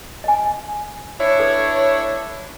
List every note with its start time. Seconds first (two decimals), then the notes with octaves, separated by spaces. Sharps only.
0.24 D#5 G#5
1.20 D4 E4 C#5
1.40 A4 B4